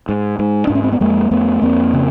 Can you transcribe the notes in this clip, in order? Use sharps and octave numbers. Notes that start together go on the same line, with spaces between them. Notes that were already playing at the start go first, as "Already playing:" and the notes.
G#2
G#2
G#2 D4
C#4
C4
B3
F2 G#3 A#3
F2 A3 B3
F2 A#3 C4
C#3